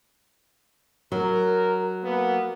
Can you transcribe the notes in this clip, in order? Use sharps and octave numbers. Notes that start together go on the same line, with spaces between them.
F#3 A#4
A#3 B3